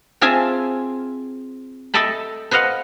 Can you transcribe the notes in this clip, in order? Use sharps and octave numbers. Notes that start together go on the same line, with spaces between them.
C4 F4 G#4 E5 G#5 A5
A4 D#5 E5 G5 A5 B5
B4 C5 D#5 F5 F#5